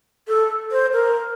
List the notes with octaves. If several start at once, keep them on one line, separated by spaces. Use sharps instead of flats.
A4
C5
A#4